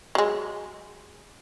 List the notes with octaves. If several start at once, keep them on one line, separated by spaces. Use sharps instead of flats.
F#3 G#3